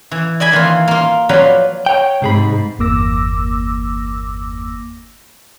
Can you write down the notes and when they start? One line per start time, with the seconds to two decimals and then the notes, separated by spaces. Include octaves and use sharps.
0.11 E3
0.40 D5 D#5 G#5 B5
0.52 D#3 E3 A#3 F4
0.88 A#3 F4
1.29 F3 F#3 F4 B4 D5
1.86 C#5 G5
2.22 G#2 C3 G#4 B5
2.79 G1 E2 A#3 D6 E6 A#6